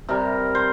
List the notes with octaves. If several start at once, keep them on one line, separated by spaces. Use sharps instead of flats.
C3 G3 A#4
C5